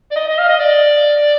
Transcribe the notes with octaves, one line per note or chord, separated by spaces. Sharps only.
D5
D#5
D#5
F5
D#5
D5